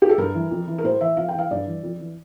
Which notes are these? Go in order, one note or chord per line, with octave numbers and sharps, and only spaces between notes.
G4
A4
G2 A#4
E3
F2
E3
A#4
A2 C5
E3 E5
F2 F5
G5
E3 F5
G2 D5
E3
F2
E3